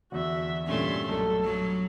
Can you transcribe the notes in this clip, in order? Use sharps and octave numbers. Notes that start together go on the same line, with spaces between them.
E2 D3 F#4 E5
G2 A#2 A3 C#4 C6
B1 A4
F#3